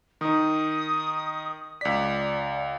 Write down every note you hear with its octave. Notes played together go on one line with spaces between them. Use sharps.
D#3 D#4 D#6
C#2 D5 B6